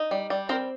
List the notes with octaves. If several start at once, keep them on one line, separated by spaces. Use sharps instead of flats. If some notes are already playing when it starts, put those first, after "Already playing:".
Already playing: D#4
G3
G3
C4 A#4 C5